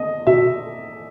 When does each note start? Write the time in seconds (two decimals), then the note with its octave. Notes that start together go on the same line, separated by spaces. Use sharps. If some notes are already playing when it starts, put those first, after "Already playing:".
Already playing: B3 D#5
0.27 B2 E5